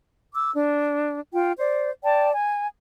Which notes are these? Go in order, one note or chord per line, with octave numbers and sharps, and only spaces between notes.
D6 E6
D4
F4 G5
C5 D5
D5 G5 A5
G#5